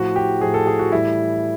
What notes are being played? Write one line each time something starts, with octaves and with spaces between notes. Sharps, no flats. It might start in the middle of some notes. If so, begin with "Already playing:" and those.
Already playing: A2 F3 F#4
G4
A2 F3 G#4
A4
G#4
F#4
A2 E3 G3 E4